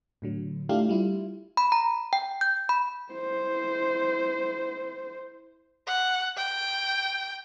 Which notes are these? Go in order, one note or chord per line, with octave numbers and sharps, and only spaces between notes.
A2 D3 F#3
A3 D4 E4 F4 G4 F5
G3 E4 F4
B5
A#5
G5
G6
B5
E4 C5
F#5
G5